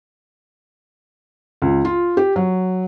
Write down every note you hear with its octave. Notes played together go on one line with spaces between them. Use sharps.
C#2
F4
G4
F#3